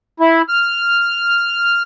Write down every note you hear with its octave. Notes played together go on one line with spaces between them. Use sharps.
E4
F6